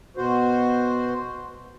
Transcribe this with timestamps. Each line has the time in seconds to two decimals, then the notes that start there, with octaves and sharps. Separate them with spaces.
0.17 B2 F#4 C5